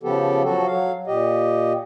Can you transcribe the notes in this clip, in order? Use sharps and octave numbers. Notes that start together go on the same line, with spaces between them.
C#3 F3 B3 G4 A4
F3 F#3 F#4 A4
F#3 F5
A#2 G4 D#5